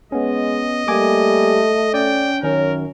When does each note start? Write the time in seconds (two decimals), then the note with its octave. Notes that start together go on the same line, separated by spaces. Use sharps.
0.12 G#3 B3 C#4 D#5
0.88 G3 A3 A#3 G#5 D6
1.94 C#4 D5 G5
2.43 F#2 D#3 C#4 A#4 C#5